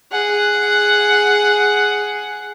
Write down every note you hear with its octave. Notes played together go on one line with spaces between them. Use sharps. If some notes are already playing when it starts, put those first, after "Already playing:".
G#4 F#5